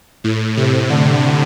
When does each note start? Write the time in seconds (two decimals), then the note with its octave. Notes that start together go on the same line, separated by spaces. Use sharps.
0.24 A2
0.57 C3
0.90 D3